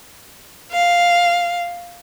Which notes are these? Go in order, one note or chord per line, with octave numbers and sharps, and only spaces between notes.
F5